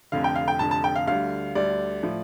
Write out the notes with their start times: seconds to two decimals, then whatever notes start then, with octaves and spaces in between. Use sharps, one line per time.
0.12 F1 F2 D3 F5
0.24 G5
0.35 F5
0.48 G5
0.59 F1 F2 D3 A5
0.71 A5
0.84 G5
0.95 F5
1.07 D2 D3 G3 F5
1.55 D2 D3 G3 D5
2.03 A2 F3